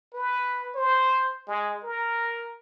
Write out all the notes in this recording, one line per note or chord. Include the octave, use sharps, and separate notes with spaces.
B4
C5
G#3
A#4